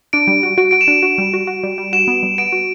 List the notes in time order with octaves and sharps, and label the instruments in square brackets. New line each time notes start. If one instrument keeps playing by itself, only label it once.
[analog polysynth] D4 [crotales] D7
[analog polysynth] G3
F#4
[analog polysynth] F#4 [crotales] D7
[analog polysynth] F#4 [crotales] D7
[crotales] E7
[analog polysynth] D4
F#4
G3
F#4
F#4
G3
G3
[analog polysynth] F#4 [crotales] E7
[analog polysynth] B3
G3
[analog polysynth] B3 [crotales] D7
[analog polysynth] F#4